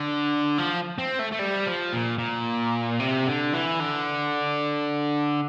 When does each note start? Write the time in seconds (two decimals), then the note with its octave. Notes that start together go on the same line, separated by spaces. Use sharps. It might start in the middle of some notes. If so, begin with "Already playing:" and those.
Already playing: D3
0.58 F3
0.98 C4
1.19 A3
1.32 A3
1.39 G3
1.66 F3
1.93 A#2
2.19 A#2
2.99 C3
3.26 D3
3.53 E3
3.80 D3